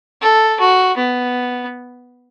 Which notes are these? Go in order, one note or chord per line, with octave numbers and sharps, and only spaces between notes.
A4
F#4
B3